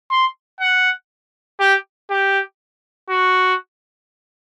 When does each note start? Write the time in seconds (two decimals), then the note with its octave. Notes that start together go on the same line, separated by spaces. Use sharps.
0.11 C6
0.61 F#5
1.60 G4
2.11 G4
3.10 F#4